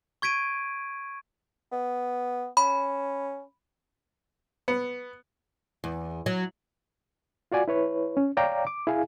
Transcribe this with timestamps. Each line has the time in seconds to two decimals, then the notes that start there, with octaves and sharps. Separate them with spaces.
0.22 C#6 G#6 B6 D7 D#7
1.72 B3
2.57 C#4 B5
4.68 B3
5.84 E2
6.26 F#3
7.52 F4 F#4 D5 G#5
7.68 E4 B4 C#5
8.17 C#4
8.37 C#5 D5 F5 G5 A#5 D6
8.67 D6
8.87 E4 G#4 F5 G#5